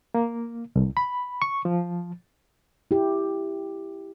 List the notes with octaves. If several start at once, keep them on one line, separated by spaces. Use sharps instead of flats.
A#3
C2
B5
C#6
F3
E4 G4